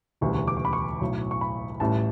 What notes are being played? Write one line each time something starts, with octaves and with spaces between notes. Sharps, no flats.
E1 D2 C#3 E3 G3 C#6
C#6
D6
C#6
B5
C#6
B1 A2 F#3
C#6
B5
A1 A2 G3 A5